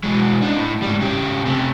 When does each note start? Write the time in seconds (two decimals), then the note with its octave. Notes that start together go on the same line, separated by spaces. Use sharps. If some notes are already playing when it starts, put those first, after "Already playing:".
0.04 B2 G#3
0.42 D4 D#4
0.57 A2
0.82 G#2 G3
1.00 C#3 G4
1.45 C3 A3